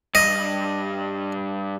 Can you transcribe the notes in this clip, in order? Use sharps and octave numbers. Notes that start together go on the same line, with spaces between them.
G2 D#5